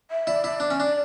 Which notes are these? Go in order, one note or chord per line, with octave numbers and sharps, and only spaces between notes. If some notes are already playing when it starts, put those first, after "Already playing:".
E5
E4 D5
E4
D4
C#4
D4